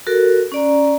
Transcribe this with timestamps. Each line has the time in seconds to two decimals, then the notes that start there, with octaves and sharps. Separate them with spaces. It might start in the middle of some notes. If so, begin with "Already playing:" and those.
0.07 F#4 A4 A#4
0.52 C#4 D5 A#5